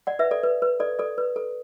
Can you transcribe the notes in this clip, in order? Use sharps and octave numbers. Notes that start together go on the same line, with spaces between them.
D5 F#5
B4 E5
A4 D5
B4
B4
A4 D5
A4 D5
B4
A4